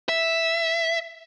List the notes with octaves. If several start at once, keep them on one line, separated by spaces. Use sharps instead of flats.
E5